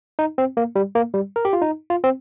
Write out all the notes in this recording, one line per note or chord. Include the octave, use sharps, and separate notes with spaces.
D#4
C4
A#3
G3
A#3
G3
A#4
G4
F4
D#4
F4
C4